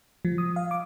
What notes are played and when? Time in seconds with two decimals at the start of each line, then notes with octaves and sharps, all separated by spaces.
0.25 F3
0.38 D#6
0.56 F5
0.71 D6